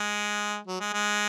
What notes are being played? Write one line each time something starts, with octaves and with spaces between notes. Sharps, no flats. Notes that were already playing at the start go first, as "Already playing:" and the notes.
Already playing: G#3
F#3
G#3
G#3